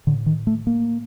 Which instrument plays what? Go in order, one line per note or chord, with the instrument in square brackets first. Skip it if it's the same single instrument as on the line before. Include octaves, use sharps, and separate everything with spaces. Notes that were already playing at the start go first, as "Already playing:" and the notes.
[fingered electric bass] A2 D3
D#3
A3
A#3